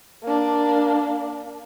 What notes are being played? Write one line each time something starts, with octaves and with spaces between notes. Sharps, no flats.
A#3 D4